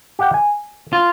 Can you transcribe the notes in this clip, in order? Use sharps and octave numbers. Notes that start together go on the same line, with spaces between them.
G4 F#5 G5
G#5
F4